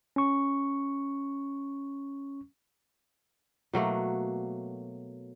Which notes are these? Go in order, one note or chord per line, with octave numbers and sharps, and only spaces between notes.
C#4 C#6
B2 F#3 A3 A#3